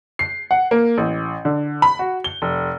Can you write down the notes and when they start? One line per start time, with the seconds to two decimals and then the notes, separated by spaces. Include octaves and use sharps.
0.19 C7
0.51 F#5
0.71 A#3
0.98 A1
1.45 D3
1.82 B5
1.99 F#4
2.24 G7
2.42 F1